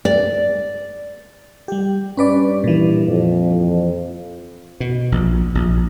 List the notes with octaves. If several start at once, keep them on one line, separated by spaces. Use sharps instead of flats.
D5
G3 G4
G2 C#4 B4 D5
A#2 E3
F2
B2
A#1
A#1